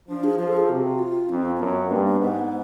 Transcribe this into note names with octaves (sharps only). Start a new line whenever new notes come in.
F3 D4
G#4
F3 G#4
A4
G#4
C3 F#4
F4
F2 C4
C4
F#2 B3
G2 A#3
B3
G#2 B3